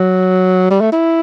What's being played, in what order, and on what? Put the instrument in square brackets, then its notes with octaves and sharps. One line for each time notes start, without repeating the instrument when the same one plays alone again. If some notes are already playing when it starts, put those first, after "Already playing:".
Already playing: [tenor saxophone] F#3
G3
A3
E4